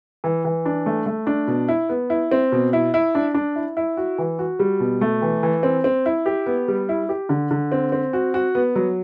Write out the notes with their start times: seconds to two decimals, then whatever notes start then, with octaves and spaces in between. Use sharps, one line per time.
0.24 E3
0.45 E3
0.66 D4
0.86 A3
1.06 A3
1.27 D4
1.47 B2
1.68 E4
1.89 B3
2.10 E4
2.31 C4
2.52 B2
2.73 E4
2.94 E4
3.15 D4
3.34 D4
3.56 E4
3.77 E4
3.97 F#4
4.18 E3
4.39 F#4
4.59 G3
4.80 B2
5.01 A3
5.22 E3
5.43 E3
5.63 C4
5.84 C4
6.06 E4
6.26 G4
6.46 B3
6.68 G3
6.89 E4
7.09 G4
7.29 D3
7.51 D3
7.72 C4
7.92 C4
8.13 F#4
8.34 F#4
8.55 B3
8.76 F#3